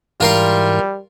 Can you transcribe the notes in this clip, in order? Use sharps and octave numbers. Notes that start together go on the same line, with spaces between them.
G#2 E3 G3 F4 A#4 C6